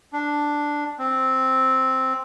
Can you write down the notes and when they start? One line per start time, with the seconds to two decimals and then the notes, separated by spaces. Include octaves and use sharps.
0.13 D4
0.99 C4